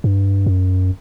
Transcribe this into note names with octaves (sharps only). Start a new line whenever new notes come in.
G2
F#2